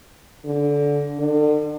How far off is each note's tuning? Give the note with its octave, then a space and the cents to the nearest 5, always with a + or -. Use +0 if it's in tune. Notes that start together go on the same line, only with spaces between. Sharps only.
D3 -20
D3 +35